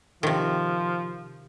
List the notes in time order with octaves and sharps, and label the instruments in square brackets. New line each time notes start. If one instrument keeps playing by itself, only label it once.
[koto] C3 D#3 [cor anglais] F3